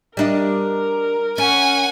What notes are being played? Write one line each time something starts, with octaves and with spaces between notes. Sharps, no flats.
G3 D4 A#4 D#5
C#4 F#5 G#5